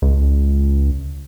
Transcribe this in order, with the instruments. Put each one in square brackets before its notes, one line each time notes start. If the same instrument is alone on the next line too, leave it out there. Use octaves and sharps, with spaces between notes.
[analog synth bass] C#2